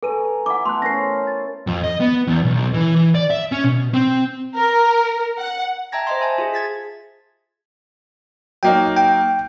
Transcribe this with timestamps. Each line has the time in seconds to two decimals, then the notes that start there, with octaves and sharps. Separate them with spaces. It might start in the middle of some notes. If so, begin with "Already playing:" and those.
0.03 A4 B4 G#5 A#5 C#6 D#7
0.46 E4 F#5 D6
0.65 A3 B3 A4 C6 F#6
0.82 C#4 A#4 C5 A#6 C7
1.27 A6
1.67 F2
1.84 D#5
2.00 B3
2.27 E2
2.44 B1
2.74 E3
2.96 E3
3.15 D5
3.30 E5
3.52 C#4
3.64 B2
3.94 C4
4.56 A#4
5.40 F#5
5.92 E5 G5 A5 A#5 G#6 A#6
6.07 C5 D#5 C6
6.21 E5 G#5 A5
6.38 F4 G#4
6.54 G#6 A6 B6
8.63 F#3 A#3 D#4 G5
8.96 G5